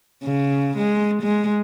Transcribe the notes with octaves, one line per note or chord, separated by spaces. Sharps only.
C#3
G#3
G#3